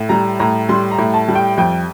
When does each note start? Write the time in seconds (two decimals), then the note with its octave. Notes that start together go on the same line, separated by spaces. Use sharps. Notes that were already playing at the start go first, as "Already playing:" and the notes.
Already playing: A2
0.09 G3 A#5
0.39 A2 A#5
0.69 G3 C6
0.91 A#5
0.98 A2
1.14 A5
1.28 G3
1.35 G5
1.58 F2 G5